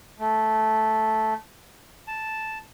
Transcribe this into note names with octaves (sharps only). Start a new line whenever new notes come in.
A3
A5